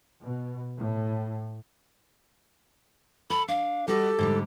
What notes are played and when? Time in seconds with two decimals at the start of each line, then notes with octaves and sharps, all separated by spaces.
0.22 B2
0.77 A2
3.30 A4 B5
3.48 D4 F5
3.88 G3 F#4 G4 A4 D#5
4.19 G#2 D3 G3